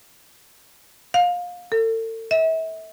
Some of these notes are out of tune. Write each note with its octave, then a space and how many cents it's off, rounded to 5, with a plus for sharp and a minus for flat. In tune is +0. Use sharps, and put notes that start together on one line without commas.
F5 +25
A4 +40
E5 -35